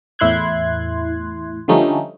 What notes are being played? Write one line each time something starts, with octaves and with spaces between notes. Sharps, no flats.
E2 A2 E4 C6 F#6 G#6
D3 F3 G3 A3 C#4 D#4